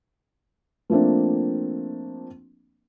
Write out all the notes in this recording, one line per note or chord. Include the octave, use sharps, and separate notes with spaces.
F3 A3 A#3 C4 D4